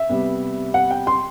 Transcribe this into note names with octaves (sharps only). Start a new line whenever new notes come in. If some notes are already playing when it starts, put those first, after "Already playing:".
Already playing: E5
C3 G3 B3
F#5
G5
C6